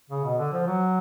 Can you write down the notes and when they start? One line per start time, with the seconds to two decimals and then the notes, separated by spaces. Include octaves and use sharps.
0.10 C#3
0.24 B2
0.38 D3
0.52 F3
0.67 F#3